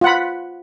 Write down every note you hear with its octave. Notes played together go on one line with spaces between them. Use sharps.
F4 F#5 B5